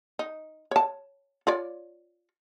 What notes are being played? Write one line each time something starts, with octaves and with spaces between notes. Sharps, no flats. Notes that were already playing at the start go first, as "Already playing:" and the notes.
D#4
C#5 A5
F4 C#5 D5